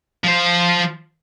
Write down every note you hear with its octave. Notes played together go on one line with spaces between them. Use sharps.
F3 C5